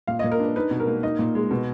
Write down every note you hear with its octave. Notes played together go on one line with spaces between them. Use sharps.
A#2 F5
D#5
A#2
A#4
D4 B4
D#4 B4
B2
A#4
A#3
D#4 D#5
A#2
G#3
B2